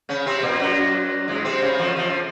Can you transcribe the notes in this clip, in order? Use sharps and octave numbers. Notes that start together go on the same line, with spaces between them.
C#3 C#4
C3 C4
A#2 A#3
F#2 F#3
G#2 G#3
C3 C4
C#3 C#4
F2 F3
F2 F3